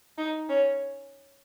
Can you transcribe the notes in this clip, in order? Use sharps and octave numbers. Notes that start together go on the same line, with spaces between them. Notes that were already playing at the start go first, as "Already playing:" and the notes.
D#4
C#4